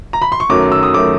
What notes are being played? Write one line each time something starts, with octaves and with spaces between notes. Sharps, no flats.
A#5
B5
C6
C#6
F#2 D#3 F#3 A3 D6
E6
D#6
D#3 F#3 A3 D6